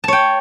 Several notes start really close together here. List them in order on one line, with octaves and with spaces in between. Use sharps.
A5 C#5 G5